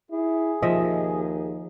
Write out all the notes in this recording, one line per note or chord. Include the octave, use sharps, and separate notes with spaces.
E4 G#4
D#2 F3 D#5 E5